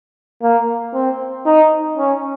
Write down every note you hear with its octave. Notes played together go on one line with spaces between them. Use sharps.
A#3
C4
D#4
C#4